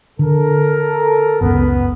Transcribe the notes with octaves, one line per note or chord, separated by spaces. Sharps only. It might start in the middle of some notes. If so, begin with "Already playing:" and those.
D3 A4 A#4
F#1 C#2 C#3 B3